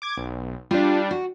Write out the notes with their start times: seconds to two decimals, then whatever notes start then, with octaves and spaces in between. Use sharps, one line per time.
0.02 D6 G#6
0.17 B1
0.71 G3 D4 F4
1.11 F#4